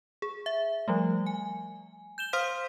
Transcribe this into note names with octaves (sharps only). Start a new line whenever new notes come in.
G#4
E5
F3 G3 A3
G#5
G6 E7 G7
C5 F5 C6 D#6 F6 B6